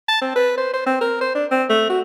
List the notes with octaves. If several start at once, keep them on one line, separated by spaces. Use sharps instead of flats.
A5
C4
B4
C5
C5
C4
A#4
C5
D4
C4
A3
F#4